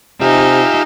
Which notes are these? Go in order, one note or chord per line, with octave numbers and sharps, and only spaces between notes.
C3 D#4 F4 G4 E5 G#5